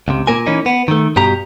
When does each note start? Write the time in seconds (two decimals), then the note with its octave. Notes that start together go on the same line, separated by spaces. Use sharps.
0.08 C#2 C3
0.27 A#2 A#3 A#4 G#5
0.46 E3 A#3 C#4 D#4
0.66 B3
0.88 D#3 A3
1.16 G2 B2 G4 A#5